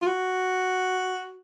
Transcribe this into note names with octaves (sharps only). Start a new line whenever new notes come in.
F4
F#4